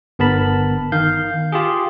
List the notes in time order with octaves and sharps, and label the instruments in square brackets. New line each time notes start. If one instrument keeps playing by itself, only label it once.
[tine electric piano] G1 B3 A#4 A5 B5
D#3 F5 G6
F4 G4 G#4